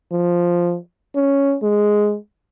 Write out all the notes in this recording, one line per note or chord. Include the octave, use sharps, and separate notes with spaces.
F3
C#4
G#3